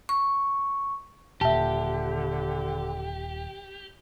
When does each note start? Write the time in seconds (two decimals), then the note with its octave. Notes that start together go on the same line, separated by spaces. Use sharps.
0.09 C#6
1.41 D#1 A#2 D3 G4 E5 A5